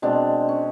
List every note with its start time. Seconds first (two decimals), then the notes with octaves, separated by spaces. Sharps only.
0.02 B2 G#3 C4 D4
0.49 C#4